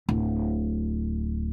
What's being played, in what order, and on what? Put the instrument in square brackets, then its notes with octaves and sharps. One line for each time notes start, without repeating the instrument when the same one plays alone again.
[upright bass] D1